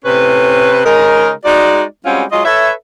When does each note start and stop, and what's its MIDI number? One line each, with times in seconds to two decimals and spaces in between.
0.04 0.80 45
0.04 0.80 48
0.04 0.80 61
0.04 0.80 71
0.85 1.30 49
0.85 1.30 56
0.85 1.30 63
0.85 1.30 70
1.44 1.82 56
1.44 1.82 63
1.44 1.82 66
1.44 1.82 74
2.05 2.23 55
2.05 2.23 56
2.05 2.23 60
2.05 2.23 61
2.05 2.23 65
2.05 2.23 66
2.31 2.43 54
2.31 2.43 56
2.31 2.43 65
2.31 2.43 75
2.44 2.71 69
2.44 2.71 71
2.44 2.71 73
2.44 2.71 76